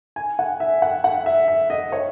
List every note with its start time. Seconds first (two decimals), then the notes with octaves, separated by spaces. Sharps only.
0.16 G#5
0.39 F#5
0.60 E5
0.82 F#5
1.04 F#5
1.26 E5
1.48 E5
1.70 D#5
1.92 C#5